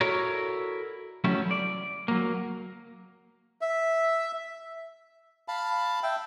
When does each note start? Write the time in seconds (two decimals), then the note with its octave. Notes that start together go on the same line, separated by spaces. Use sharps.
0.01 E4 F#4 A4 A#4 C#5 D5
1.24 F#3 G3 A3 C#4 E4
1.51 D5
2.08 F#3 A#3
3.61 E5
5.48 F5 A5 B5
6.03 E5 G5